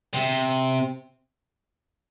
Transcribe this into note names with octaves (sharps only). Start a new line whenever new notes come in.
C3